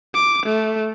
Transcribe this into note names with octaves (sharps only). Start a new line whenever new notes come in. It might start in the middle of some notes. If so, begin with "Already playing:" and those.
D6
A3